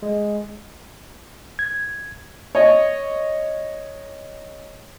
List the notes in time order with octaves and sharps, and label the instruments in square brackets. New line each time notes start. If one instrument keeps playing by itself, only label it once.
[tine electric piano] G#3
G#6
[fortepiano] C#5 D#5